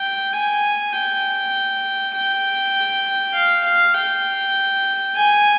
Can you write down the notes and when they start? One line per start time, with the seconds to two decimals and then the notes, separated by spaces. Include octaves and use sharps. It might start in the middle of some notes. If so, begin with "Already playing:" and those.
Already playing: G5
0.33 G#5
0.93 G5
2.13 G5
3.34 F5
3.64 F5
3.95 G5
5.16 G#5